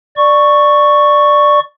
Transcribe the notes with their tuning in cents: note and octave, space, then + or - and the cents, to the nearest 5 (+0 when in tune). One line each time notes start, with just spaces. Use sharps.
D5 +10 C#6 +0